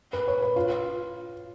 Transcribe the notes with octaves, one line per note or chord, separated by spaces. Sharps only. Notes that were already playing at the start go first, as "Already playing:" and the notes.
B4
C#5
B4
F4